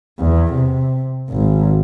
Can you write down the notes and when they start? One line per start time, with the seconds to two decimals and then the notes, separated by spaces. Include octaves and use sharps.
0.19 E2
0.53 C3
1.30 G#1